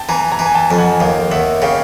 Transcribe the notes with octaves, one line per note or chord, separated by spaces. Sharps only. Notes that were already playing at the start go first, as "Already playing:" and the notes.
Already playing: G5 A5
E3 G#5 A#5
G#5 A#5
E3
G#5
G5 A5
F2
F#5 G#5
D#2 F5 G5
D#2 E5 F#5
C#3 F5 G5